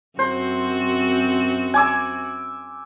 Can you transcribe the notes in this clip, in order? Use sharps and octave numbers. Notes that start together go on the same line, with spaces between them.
F#2 C4 F#4 C5
G#5 D6 E6